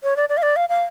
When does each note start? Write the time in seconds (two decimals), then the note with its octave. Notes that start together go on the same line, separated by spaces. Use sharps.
0.03 C#5
0.17 D5
0.29 D5
0.37 F5
0.42 D5
0.56 F5
0.69 F5